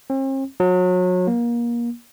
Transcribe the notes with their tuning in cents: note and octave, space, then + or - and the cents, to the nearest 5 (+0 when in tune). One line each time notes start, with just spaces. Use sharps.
C4 +45
F#3 -30
A#3 +30